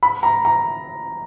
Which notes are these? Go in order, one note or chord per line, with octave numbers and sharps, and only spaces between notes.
B5
A#5
A#5